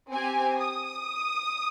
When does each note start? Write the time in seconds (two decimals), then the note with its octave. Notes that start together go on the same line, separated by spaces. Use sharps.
0.12 C4 G4 G#5
0.61 D#6